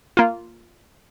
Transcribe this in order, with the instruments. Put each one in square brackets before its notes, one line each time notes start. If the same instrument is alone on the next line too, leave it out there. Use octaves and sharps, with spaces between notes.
[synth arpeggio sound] A#3 F4